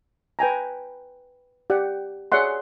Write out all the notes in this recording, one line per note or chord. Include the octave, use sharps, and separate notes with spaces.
B4 G5 G#5 A#5
G4 D5 F#5 G5
G#4 C#5 D5 E5 F#5 C6